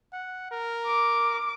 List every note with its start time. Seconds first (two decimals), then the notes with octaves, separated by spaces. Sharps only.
0.13 F#5
0.51 A#4
0.86 D6